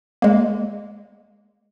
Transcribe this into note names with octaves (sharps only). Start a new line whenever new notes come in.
G#3 A#3